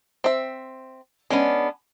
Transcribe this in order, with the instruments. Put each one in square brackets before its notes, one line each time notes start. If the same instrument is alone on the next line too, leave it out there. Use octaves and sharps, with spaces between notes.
[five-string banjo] C4 E5
[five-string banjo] G#3 [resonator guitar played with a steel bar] B3 C#4 D4